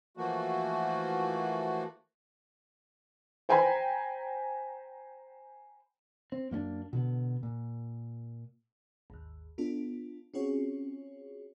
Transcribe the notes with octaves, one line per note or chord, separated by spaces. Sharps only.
E3 F3 A3 A#3 F#4
C5 G5 G#5 A#5 B5
C4
F#2 A#3 C#4 D4
B2 D3 B3
A#2
G#1 D#2
B3 D4 F4 A4
C4 C#4 F4 F#4 G#4 C#5